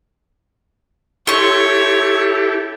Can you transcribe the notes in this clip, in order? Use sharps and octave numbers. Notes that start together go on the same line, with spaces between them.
E4 G4 A4 C#5 C6 C#6